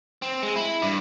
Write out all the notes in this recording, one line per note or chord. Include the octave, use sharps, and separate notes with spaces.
C4
G#3
E4
G2